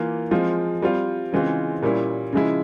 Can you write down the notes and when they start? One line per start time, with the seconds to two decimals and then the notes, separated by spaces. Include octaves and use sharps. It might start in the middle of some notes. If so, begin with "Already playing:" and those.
Already playing: E3 A#3 F4
0.31 F3 G#3 C4 F4
0.82 G3 C4 F4
1.32 C#3 E3 G#3 C4 F4
1.82 A#2 G3 C#4 E4
2.33 C#3 F3 G#3 E4